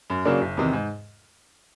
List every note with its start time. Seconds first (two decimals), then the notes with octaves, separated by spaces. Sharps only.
0.10 F#2
0.25 C#3 F#3 A#3 D4
0.41 F#1
0.57 E2 C3 D#3
0.73 G#2